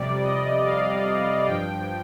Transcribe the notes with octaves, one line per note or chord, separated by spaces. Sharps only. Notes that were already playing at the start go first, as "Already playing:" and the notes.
Already playing: F2 C3 G3 D5
D#5
F5
G2 F3 G5